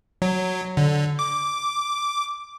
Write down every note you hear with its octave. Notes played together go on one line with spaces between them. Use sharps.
F#3
D3
D6